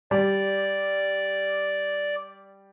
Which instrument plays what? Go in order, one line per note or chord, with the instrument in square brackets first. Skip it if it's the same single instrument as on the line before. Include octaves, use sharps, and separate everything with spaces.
[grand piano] G3 [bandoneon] D5